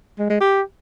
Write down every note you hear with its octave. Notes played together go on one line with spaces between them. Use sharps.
G#3
G#3
G4